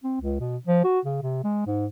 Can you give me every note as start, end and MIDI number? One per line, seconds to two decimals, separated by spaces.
0.04 0.19 60
0.21 0.37 37
0.40 0.57 47
0.67 0.81 53
0.84 1.00 66
1.05 1.17 49
1.22 1.43 48
1.44 1.63 56
1.67 1.87 44